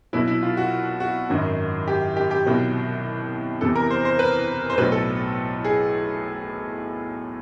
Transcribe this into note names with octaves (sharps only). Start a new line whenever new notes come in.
C2 B2 F#3 E4
E4
F4
F#4
F#4
G#1 F#2 D#3 F#3
G4
G4
G4
C2 B2 F#3
E2 C3 E3 A4
A#4
C5
C5
B4
C5
B1 A2 F#3 B4
A4
G#4